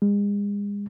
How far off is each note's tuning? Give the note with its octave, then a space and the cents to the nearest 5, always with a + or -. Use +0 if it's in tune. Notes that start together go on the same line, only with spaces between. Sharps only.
G#3 -40